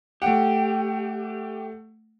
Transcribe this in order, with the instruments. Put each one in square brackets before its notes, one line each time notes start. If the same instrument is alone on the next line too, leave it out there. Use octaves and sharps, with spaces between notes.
[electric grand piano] A3 F#5 [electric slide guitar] G4